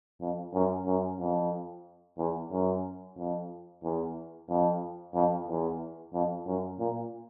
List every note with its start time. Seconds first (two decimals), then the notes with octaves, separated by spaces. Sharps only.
0.21 F2
0.53 F#2
0.86 F#2
1.19 F2
2.18 E2
2.51 F#2
3.17 F2
3.83 E2
4.49 F2
5.14 F2
5.48 E2
6.13 F2
6.46 F#2
6.79 A#2